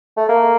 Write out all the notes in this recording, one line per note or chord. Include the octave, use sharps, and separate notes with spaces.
A3
A#3